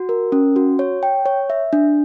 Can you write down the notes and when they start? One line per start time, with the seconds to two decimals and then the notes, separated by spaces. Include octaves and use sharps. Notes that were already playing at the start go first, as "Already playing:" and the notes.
Already playing: F#4
0.09 A#4
0.32 C#4
0.56 F#4
0.79 C#5
1.03 G5
1.26 C#5
1.50 E5
1.73 D4